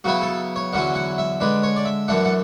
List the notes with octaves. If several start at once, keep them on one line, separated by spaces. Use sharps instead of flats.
C#3 F#3 B3 E4 F#4
A4
C#5
E2 D3 F#3 C#4 E4 F#5
F#5
E5
D3 G#3 D4 B4
C#5
D5
E5
F#2 E3 A3 D4 F#5
F#5